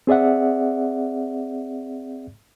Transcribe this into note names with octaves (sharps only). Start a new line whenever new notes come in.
C4 G#4 D5 E5 F#5